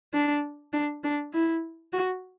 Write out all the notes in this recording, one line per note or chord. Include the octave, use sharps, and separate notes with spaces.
D4
D4
D4
E4
F#4